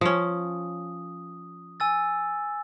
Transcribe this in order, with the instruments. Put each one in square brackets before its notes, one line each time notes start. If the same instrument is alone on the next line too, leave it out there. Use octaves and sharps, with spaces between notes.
[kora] F3 C#4 [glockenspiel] D#6
[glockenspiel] G#5 E6 A6